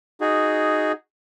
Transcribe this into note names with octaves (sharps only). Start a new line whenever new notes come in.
D#4 F#4 G#4